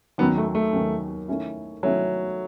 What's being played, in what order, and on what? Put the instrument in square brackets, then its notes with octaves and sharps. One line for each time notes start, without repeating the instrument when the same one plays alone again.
[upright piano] D#2 D#3 F#3 C#4 [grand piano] B3
[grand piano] A3
A3
[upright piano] D#2 D#3 F#3 C#4
D#3 A3 C#4 E4
[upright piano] D#3 A3 C#4 E4 [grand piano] F#3